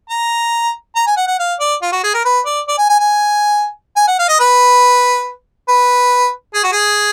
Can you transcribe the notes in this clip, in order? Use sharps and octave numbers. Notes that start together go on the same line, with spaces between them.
A#5
A#5
G#5
F#5
F#5
F5
D5
F4
F#4
G#4
A#4
B4
D5
D5
G#5
G#5
G#5
G#5
F#5
F5
D#5
B4
B4
G#4
F#4
G#4